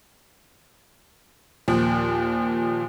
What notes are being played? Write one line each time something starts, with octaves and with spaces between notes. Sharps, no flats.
D#2 A#2 F3